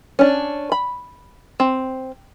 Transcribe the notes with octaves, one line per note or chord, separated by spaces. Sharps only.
C#4 D4
B5
C4